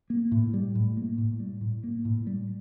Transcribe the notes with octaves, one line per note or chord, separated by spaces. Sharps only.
A#3
A2
G3
A2
A#3
A2
G3
A2
A#3
A2
G3